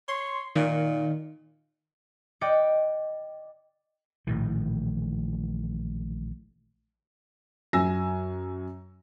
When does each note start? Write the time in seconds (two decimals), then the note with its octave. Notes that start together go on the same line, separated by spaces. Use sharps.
0.08 C#5 C6
0.55 A#2 D#3
2.41 D5 D#5 G5 D6 F#6 C#7
4.27 A#1 A2 D#3 E3
7.73 F#2 G#5 E6 A#6